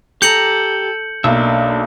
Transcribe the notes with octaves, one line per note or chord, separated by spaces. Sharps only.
G4 A4 A#5 G6 C#7 F#7
B1 A#3 D4 E5